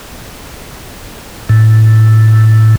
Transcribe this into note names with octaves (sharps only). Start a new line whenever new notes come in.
A2